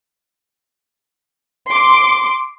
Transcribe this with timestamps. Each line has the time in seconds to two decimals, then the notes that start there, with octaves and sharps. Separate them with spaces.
1.70 C6 D6